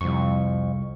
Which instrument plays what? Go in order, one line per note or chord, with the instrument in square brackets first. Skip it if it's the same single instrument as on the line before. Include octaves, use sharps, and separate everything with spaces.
[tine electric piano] C2 C#6 [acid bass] F2